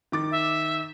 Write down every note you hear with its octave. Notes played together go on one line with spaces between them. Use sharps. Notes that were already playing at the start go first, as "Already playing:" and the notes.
D#3 D6 A6
E5